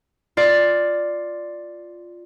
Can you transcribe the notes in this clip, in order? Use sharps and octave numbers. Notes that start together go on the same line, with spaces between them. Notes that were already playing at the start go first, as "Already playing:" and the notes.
F4 D5